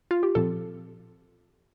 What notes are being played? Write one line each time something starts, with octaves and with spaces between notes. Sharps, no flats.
F4
G4
A#2 F3 C4 A4